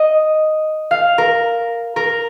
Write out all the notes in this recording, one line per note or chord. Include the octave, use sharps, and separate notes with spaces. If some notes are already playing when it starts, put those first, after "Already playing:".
Already playing: D#5
F5
A#4
A#4